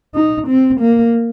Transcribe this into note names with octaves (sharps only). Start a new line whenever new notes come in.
D#4
C4
A#3